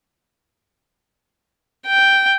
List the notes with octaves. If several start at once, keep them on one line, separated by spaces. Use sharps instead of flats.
G5